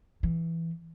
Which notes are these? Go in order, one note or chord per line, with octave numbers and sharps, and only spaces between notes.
E3